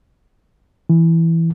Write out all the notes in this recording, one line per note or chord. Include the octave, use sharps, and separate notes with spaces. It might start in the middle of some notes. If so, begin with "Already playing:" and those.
E3